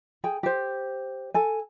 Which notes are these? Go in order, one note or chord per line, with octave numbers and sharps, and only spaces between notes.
G#4 G5
G4 C5
A4 G#5